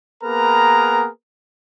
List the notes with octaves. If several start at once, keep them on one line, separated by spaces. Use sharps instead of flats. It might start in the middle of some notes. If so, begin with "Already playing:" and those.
A#3 B3 G#4 A#4 B4 A#5